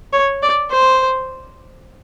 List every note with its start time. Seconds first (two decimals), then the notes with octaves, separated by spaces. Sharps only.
0.13 C#5
0.42 D5
0.70 C5